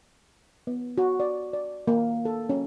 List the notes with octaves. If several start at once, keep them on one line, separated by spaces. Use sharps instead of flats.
B3
F#4
D5
D5
A#3
A4
C#4